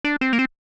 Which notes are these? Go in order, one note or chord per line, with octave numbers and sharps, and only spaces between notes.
D4
C4
A#3
C4